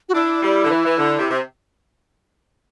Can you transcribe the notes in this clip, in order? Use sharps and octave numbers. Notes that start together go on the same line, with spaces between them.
F#4
D4 E4
G3
D3
E3
E3
D3
C3
C3